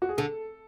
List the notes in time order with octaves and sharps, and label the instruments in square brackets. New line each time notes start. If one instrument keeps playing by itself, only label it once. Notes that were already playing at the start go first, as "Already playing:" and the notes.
[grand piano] F#4
G#4
[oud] D3 [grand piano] A4